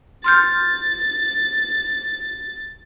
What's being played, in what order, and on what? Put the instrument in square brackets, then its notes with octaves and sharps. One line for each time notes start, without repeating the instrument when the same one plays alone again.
[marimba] C6 F6 G6 [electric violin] A6